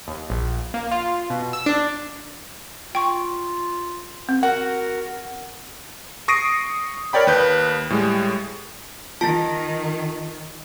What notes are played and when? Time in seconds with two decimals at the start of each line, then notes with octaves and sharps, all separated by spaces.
0.08 D#2
0.30 A#1
0.74 A#3
0.92 F4
1.30 B2
1.53 E6
1.66 D4
2.95 F4 G5 C#6
4.29 C4
4.43 F#4 A#4 F#5
6.28 C#6 D#6 A#6 C7 D7 D#7
7.13 A#4 C#5 D5 G5 B5
7.27 D#2 B4 G6
7.90 A2 G3 G#3
9.21 D#3 F4 A5